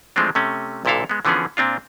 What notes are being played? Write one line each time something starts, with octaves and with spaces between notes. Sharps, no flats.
E3 F3 G#3 A3 C4 D4
C3 A3 C#4
B1 A#2 D3 E4 A4 F5
G#3 B3
D3 E3 F3 B3 C#4 G#4
A#2 C4 D4 F4